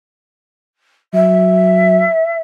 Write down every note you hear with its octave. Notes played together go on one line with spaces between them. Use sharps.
F#3 E5